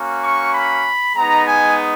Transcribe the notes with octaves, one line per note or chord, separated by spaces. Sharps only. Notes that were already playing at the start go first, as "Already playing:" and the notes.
Already playing: A#3 C#4 F#4
C#6
B5
G#3 B3 D#4 A#5
G#5